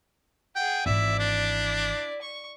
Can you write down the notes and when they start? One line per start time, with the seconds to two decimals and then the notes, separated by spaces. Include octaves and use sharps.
0.56 G#4 F#5 G5
0.86 G#1 E3 E4 D5 E5
1.19 D4
2.22 C#6